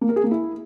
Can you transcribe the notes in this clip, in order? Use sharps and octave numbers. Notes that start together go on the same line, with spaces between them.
A#3
A#4
G#4
A#3
E4